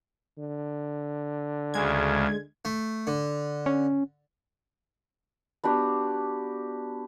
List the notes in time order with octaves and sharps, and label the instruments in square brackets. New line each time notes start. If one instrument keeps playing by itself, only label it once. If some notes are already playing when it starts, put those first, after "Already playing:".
[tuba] D3
[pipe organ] D2 C#3 [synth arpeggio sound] G#3 G#6
[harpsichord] A3
D3
[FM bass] C#4
[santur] B3 D4 F#4 G4